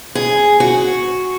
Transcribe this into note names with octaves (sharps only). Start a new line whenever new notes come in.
G#4
F#4